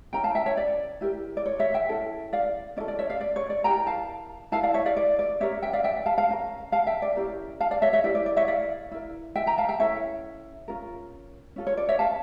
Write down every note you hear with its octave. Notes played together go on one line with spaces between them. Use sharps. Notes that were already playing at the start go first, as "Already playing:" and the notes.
C#4 E4 A#4 G5 A#5
F5 A5
E5 G5
C#5 E5
D5
E4 G4 A#4
D5
C#5
C#5 E5
E5 G5
C#4 E4 A4
D5 F5
C#4 E4 A4 D5
D5
C#5 E5
D5 F5
D5
C#5
D5
E4 G4 A#4 G5 A#5
F5 A5
E4 A#4 F5 A5
D5 F5
C#5 E5
D5 F5
D5
D5
C#4 G4 A#4 C#5 E5
E5 G5
D5 F5
E5 G5
F5 A5
F5 A5
C#4 G4 A#4
F5 A5
E5 G5
D5
C#4 E4 G4 A#4
F5 A5
D5 F5
C#5 E5
C#5 E5
E4 G4 A#4 D5
D5
D5
C#5 E5
D5 F5
E4 A#4
E5 G5
G5 A#5
F5 A5
E5 G5
C#4 E4 A4 C#5 E5
C#4 F4 A#4
C#4 F4 A4
C#5
D5
C#5 E5
F5 A5